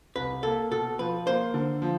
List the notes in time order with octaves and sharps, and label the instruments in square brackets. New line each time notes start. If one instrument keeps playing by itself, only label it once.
[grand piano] C2 [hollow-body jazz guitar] B4
[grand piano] A#3 [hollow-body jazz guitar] A4
[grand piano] B2 [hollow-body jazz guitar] A4
[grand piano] F3 [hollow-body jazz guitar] B4
[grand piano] A#3 [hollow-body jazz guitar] C5
[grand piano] D3
F3